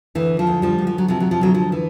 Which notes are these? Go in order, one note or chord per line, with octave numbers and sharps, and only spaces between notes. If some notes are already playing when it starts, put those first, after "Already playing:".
D2 E3
F3
D2
F3 G3
D2
F3
F#3
C3 F3
F#3
F3
D2 F#3
F3
E3